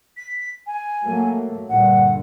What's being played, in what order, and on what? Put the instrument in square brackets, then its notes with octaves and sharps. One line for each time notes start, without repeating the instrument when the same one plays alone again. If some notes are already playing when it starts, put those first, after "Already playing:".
[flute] B6
G#5
[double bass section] F#3 A3 A#3
[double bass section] G2 A#2 D3 [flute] F#5